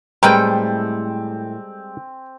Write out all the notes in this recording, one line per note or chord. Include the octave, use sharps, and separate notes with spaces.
A2 G3 G#3 C4 A#4 B4 G5